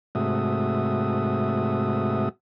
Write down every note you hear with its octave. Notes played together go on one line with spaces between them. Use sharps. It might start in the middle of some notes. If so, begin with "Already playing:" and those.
G#2 C3 A3 F#4 E5 D#6